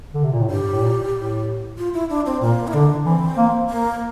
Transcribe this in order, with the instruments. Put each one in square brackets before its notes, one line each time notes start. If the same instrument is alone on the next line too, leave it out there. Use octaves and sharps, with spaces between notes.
[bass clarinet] D3
C3
A#2
A2
[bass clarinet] G2 [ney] G4
[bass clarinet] A2
A#2
A2
[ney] F4
E4
D4
C4
[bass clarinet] A#2 [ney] A#3
[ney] E4
[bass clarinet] D3 [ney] D4
[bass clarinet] E3 [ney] C4
[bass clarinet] A#3
[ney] A#3